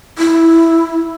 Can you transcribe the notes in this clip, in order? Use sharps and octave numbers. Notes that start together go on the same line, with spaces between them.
E4